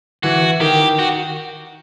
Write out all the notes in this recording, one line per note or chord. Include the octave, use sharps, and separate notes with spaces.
E3 F#4
D#3 G4
F#4